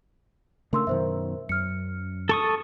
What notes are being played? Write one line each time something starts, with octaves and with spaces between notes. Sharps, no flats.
C#3 A3 D4 A#4 C6 E6
F#2 B2 D#3 A#4 C5 E5
F#2 F6 C#7
A4 C#6 D#6